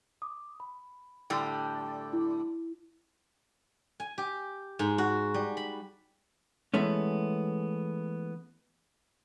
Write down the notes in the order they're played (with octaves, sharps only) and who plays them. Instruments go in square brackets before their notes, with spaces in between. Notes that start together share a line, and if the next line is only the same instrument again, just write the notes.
[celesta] D6 D#6
B5
[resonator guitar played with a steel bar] A2 D3 G3 [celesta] G5 E6
[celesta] E4
[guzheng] G#5
G4
G#2
F#4
G3
B5
[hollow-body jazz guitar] E3 G#3 A3 B3 C#4